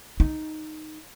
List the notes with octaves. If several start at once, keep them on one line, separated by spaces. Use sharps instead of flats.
D#4